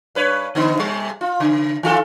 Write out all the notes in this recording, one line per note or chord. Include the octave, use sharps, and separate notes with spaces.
G2 B4 C#5
D3 B3 D#4
C3 G3
F4
C#3
D#3 F4 A4